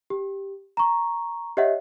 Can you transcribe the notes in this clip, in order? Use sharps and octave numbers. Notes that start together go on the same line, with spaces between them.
G4
A#5 C#6
G4 C#5 D#5 E5 F#5